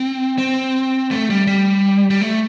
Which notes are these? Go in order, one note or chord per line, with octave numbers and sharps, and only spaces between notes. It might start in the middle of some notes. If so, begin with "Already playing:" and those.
Already playing: C4
C4
A3
G3
G3
G3
A3